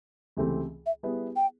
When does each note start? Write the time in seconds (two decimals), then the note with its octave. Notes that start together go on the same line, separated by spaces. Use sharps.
0.37 C#2 C3 E3 A3 C4
0.86 E5
1.03 G3 B3 E4 G#4 B4
1.36 G5